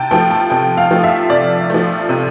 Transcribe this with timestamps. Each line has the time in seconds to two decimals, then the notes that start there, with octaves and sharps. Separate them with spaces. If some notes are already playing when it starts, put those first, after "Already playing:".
Already playing: C3 G5 A5
0.11 F3 A3 G5
0.31 A5
0.50 C3 G5
0.77 F5
0.91 F3 A3
1.04 E5
1.30 C3 D5
1.70 F3 A3
2.09 C3